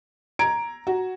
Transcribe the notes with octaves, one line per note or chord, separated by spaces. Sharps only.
A#5 G#6 D7
F#4